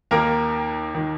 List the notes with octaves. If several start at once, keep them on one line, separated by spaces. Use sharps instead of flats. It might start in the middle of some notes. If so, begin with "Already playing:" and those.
D#2 D#3 A#3 A#4
D#3